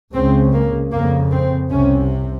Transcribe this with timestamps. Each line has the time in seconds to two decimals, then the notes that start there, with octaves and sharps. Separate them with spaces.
0.14 C#2 C#3 C4
0.53 A#3
0.92 F2 C#3 A#3
1.32 C4
1.70 C2 C3 C#4